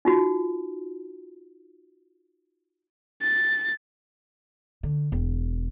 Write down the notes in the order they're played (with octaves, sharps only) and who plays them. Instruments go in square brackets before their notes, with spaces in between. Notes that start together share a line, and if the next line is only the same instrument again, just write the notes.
[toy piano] D#4 F4 F#4
[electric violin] A6
[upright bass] D3
E1